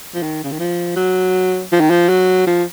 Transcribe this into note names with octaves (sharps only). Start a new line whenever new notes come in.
F3
D#3
C#3
D#3
F3
F#3
F3
D#3
F3
F#3
F3